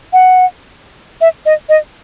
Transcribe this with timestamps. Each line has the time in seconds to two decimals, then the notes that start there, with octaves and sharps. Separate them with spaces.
0.13 F#5
1.21 E5
1.46 D#5
1.69 D#5